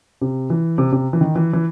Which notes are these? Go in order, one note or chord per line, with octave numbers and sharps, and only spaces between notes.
C3
E3
C3
C3
E3
D#3
E3
E3